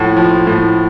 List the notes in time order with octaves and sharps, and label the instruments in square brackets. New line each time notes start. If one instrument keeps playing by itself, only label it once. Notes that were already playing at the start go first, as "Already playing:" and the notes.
Already playing: [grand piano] A2 F3 F#4
F3
A2